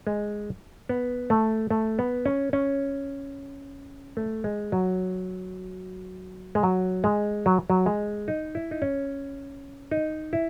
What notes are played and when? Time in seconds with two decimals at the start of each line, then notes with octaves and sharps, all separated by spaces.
0.07 G#3
0.89 B3
1.30 A3
1.71 A3
1.99 B3
2.26 C#4
2.53 C#4
4.17 A3
4.44 G#3
4.72 F#3
6.55 G#3
6.63 F#3
7.04 G#3
7.46 F#3
7.70 F#3
7.86 G#3
8.28 D#4
8.55 E4
8.71 D#4
8.82 C#4
9.91 D#4
10.33 E4